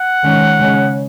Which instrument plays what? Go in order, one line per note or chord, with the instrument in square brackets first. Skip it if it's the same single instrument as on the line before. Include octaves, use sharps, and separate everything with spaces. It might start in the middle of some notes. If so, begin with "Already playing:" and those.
Already playing: [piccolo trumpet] F#5
[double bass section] D#3 G#3 C#4
C#3 G#3 C#4